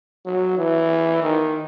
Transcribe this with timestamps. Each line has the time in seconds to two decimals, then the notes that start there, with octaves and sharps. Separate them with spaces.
0.26 F#3
0.58 E3
1.23 D#3